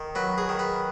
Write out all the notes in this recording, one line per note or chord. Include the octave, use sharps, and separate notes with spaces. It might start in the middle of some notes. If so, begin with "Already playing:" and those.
Already playing: D#3
F#3 B4
G#4
D#3
B4